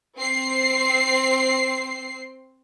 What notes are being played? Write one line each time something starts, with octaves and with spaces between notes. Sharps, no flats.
C4 C7